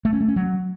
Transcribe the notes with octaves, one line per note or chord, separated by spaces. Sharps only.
A3
C#4
A3
C#4
F#3